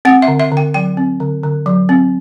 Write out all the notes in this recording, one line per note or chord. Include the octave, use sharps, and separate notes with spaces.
C4 F#5
E5
D3
E5
D3
G5
F#3 G5
C4
D3
D3
F#3
C4